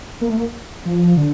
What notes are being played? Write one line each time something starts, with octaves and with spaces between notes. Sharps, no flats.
A#3
A3
A#3
F3
D3